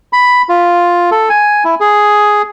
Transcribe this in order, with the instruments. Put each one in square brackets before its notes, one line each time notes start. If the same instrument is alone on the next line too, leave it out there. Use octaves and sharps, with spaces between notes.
[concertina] B5
F4
A4
G#5
E4
G#4